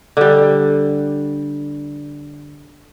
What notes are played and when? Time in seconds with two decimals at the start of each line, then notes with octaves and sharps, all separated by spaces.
0.17 D3 G3